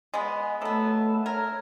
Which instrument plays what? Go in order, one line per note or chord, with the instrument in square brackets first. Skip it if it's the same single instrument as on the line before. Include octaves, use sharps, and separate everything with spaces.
[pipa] G#3 B3
[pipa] F#3 B3 [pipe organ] A3 A4 A5
[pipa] A#4 [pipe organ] C#5